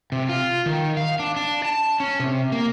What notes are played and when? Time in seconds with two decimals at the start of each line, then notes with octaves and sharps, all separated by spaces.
0.12 C3
0.29 F4
0.66 D#3
0.97 F5
1.19 D4
1.36 D4
1.65 A5
2.00 C#4
2.20 C3
2.52 A#3